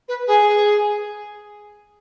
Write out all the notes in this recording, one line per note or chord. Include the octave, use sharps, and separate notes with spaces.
B4
G#4